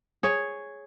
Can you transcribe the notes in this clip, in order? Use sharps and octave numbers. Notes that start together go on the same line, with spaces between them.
G#4 C#5